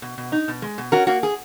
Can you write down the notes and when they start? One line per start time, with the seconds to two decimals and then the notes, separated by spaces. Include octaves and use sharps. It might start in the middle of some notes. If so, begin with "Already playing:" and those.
0.02 B2
0.18 B2
0.32 D#4
0.48 B2
0.62 G#3
0.78 B2
0.92 C#4 F#4 A#4
1.07 A#3 F#4
1.23 G#4